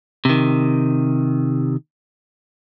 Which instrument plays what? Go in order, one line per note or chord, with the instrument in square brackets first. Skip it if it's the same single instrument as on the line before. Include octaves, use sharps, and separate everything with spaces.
[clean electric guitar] C3 D#3